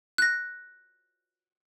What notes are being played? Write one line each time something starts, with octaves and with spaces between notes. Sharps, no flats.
F#6 A#6